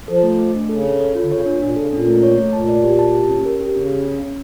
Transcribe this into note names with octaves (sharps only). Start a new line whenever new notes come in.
F3 A4
A3
A3
D4
C#3 A4
A4
A4
F4
D3
C#3 C#5
A#2 D4
A#2 D4
C#3 A4
A#2 C#4
A3
C#5
A3
A#2 A5
D5
G4
A5
G4
C#4
A#4
G4
C#3 C#4
C#4
C#4
C#4